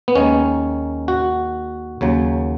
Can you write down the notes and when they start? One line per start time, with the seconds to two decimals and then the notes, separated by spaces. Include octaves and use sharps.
0.08 B3
0.15 D#2 D#3 G#3 C#4
1.08 F#4
2.01 D#2 C#3 F#3